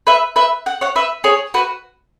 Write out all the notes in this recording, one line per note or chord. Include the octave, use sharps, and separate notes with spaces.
B4 E5
B4 E5
F#5
C#5 F#5
B4 E5
G#4 C#5
F#4 B4